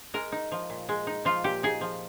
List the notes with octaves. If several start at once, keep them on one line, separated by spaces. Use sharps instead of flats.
G#3 A#4
D#4
F3
A#2
G#3
D#4
F3 F4
A#2 G4
D#4 G#4
F3